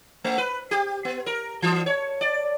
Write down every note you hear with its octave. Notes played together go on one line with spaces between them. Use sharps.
A3
B4
G4
B3
A#4
E3
C#5
D5